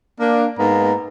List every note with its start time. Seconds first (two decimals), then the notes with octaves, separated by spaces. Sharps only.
0.20 A#3 D4
0.59 G#2 A#3 B3 A#5